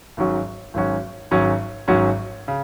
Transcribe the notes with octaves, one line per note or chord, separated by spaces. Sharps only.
G#1 G#2 F#3 C#4 F#4
G#1 G#2 F#3 C#4 F#4
G#1 G#2 F#3 C#4 F#4
G#1 G#2 F#3 C#4 F#4
C#3